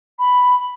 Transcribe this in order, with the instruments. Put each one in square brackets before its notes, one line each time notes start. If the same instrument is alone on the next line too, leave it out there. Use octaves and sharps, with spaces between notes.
[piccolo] B5